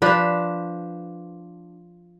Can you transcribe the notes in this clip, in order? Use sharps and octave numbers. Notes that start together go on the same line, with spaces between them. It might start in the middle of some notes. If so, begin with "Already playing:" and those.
F3 D4 B4